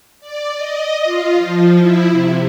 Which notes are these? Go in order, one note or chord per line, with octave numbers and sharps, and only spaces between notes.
D5
D#5
F4
F3
E4
C3